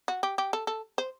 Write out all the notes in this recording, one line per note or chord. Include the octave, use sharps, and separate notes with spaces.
F#4
G4
G4
A4
A4
C5